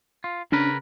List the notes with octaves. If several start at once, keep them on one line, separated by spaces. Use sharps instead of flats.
F4
C#3 C#4 D4 A#4 B4